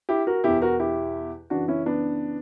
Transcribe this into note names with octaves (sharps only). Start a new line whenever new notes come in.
E4 G4
F#4 A#4
E2 B2 E4 G4
F#4 A#4
E4 G4
F#2 C#3 E3 D4 F#4
C#4 E4
B3 D4